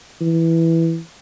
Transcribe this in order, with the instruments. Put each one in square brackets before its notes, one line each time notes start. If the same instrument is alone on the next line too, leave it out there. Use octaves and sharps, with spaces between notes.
[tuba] E3